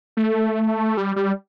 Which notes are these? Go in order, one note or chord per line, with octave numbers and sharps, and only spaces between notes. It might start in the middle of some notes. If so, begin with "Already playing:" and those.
A3
G3
G3